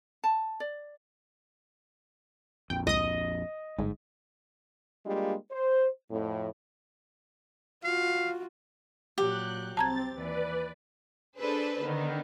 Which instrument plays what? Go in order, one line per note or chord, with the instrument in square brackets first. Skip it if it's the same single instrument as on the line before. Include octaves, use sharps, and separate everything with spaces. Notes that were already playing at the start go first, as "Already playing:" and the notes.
[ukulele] A5
D5
[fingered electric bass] A#1 F2 [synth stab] G5
[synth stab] C#2 D#6 [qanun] D#5
[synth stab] G1 [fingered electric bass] G#2
[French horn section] G3 G#3 A#3 D4 F4 G4
C5
F2 A2
[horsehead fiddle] F4 F#4 [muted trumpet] F5
[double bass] A#2 F#3 [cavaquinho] G4 [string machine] F#6
[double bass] C2 [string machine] C4 A6 [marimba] A5 A#5 G#6
[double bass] D#2 E3 [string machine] B4 D5
[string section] D4 G#4 A4 B4 C5
D3 D#3 B3